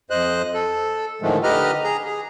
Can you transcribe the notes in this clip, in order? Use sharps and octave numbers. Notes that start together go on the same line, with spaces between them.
F2 C5 D#5 F#6
A4
A2 D3 D#3 F3 G#3 A3
D3 G4 B4 D#5 A#5 F6
G#4 A#5
G#4